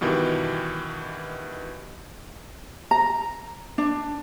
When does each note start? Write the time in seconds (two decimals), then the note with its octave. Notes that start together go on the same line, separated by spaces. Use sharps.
0.01 G2 B2 D#3 E3 G4
2.91 A#5
3.78 D4